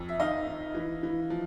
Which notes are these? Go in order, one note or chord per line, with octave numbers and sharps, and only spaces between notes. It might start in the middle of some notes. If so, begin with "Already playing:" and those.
Already playing: F2
E5
D#3 D#5 F5
D#3
E3
E3
F3